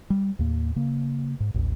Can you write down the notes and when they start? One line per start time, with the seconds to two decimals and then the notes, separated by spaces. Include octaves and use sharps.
0.10 G3
0.39 D#2 A2 A#3
0.76 C#3 A#3
1.40 G#2
1.54 A1 D#2